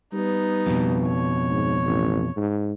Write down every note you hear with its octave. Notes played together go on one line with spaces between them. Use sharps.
G3 B3 D#4
F2 B2
C#5
G#2
A1
G#2